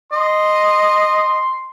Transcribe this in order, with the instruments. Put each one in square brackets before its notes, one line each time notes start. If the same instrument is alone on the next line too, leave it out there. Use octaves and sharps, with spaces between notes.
[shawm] D#5 [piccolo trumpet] C6